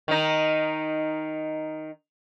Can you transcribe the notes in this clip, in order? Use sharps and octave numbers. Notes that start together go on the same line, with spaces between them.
D#3 D#4